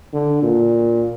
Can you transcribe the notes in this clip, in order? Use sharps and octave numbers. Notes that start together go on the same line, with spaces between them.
D3
A#2